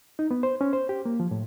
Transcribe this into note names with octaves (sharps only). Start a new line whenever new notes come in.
D#4
B3
C5
C#4
C5
G4
A#3
F3
A2